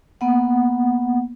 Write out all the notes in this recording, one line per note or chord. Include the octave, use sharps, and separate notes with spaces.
A#3 B3 F#5